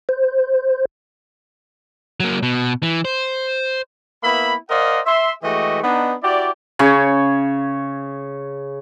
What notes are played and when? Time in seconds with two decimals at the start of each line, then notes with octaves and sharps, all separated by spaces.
0.09 C5
2.20 F#3 A#3
2.43 B2
2.83 E3
3.05 C5
4.24 A#3 B3 E4 E5 B5
4.70 A#4 C5 D5 D#5 F5 F#5
5.06 E5 C6
5.43 E3 G#3 A3 F#4 G4 D#5
5.83 B3 D4 D#4
6.23 E4 F#4 G4 D5
6.79 C#3 C#5